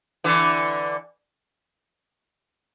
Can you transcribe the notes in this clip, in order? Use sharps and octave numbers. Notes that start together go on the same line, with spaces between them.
D3 E3